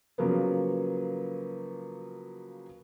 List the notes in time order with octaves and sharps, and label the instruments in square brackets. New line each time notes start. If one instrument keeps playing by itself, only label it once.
[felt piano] C#3 F3 F#3 A#3 B3